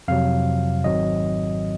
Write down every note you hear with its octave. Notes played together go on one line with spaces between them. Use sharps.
F2 C3 F#3 F5
G#1 G#2 D#3 F#3 C4 D#5